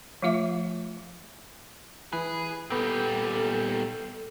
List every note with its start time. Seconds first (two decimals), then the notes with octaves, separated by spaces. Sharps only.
0.22 F3 A3 F4 E5 D6
2.13 E3 G#4 B4
2.70 A#2 G3 B3 A4 G5